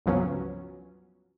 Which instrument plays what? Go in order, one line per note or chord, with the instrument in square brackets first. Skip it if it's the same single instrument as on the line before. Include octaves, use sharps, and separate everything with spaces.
[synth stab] C#2 G2 F3 F#3 B3 C#4